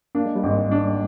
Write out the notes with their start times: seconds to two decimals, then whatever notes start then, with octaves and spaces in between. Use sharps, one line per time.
0.15 A#3 D4
0.25 G#3
0.35 G3
0.43 G#1 G#2 G#3
0.71 D4